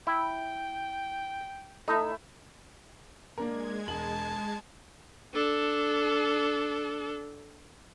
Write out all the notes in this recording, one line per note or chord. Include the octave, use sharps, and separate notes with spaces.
E4 G5
A3 D#4 E4 E5
G#3 A#3 D4 A#4 G#6
E1 A5 F#7
D4 A4